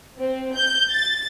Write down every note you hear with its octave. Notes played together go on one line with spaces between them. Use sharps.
C4
G6
A6